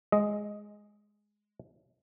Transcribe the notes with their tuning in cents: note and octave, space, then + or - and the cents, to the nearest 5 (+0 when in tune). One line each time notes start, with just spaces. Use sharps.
G#3 +0 D#5 +0